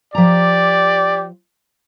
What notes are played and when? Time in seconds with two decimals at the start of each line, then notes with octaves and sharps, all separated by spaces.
0.15 F3 G4 D5 A#5